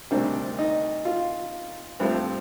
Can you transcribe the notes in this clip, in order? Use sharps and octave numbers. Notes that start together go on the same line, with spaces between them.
D2 C3 D#3 G3 C4 D4
D#4
F4
G2 F3 A3 C4